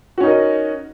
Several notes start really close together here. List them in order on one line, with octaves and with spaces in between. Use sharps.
F#4 C#4 D#4 A#4 D#5